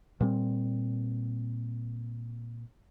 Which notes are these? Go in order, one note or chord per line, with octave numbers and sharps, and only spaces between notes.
A#2 G3 C4